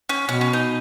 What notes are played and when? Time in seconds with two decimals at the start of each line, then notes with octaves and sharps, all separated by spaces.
0.09 C#4
0.28 B2 C#4
0.41 C#4
0.53 D#4